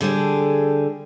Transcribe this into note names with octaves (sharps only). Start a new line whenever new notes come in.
D3 G3 G#4 A4